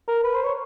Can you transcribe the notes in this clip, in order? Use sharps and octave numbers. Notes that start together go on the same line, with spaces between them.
A#4
B4
C5
C#5